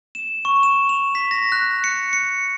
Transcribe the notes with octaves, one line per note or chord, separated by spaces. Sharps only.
E7
C#6
E7
F7
B6
A#6
F#6
C#7
C#7